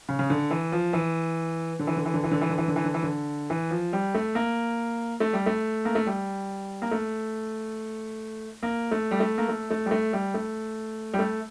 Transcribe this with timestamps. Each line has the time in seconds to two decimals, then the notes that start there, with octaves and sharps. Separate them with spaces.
0.09 C#3
0.19 C#3
0.30 D3
0.51 E3
0.72 F3
0.93 E3
1.79 D3
1.87 E3
1.97 D3
2.05 E3
2.14 D3
2.24 E3
2.31 D3
2.41 E3
2.49 D3
2.58 E3
2.68 D3
2.76 E3
2.84 D3
2.94 E3
3.03 D3
3.50 E3
3.71 F3
3.93 G3
4.15 A3
4.35 A#3
5.20 A3
5.33 G3
5.46 A3
5.85 A#3
5.95 A3
6.06 G3
6.82 A#3
6.91 A3
8.63 A#3
8.91 A3
9.11 G3
9.20 A3
9.38 A#3
9.49 A3
9.70 A3
9.86 G3
9.91 A3
10.13 G3
10.34 A3
11.13 G3
11.19 A3